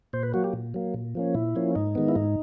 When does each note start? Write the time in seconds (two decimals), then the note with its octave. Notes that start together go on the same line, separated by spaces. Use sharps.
0.13 A#2 C5
0.23 B4
0.34 F#3 A#3 F#4
0.44 G4
0.53 A#2
0.74 F#3 A#3
0.94 A#2
1.15 F3 A#3 C#4
1.34 A#2 E4
1.55 F3 A#3 C#4
1.75 G#2 D#4
1.95 D#3 G#3 B3
2.08 E4
2.16 G#2 D#4